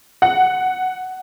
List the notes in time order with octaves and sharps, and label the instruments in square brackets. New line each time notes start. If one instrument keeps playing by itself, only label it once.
[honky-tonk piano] F#5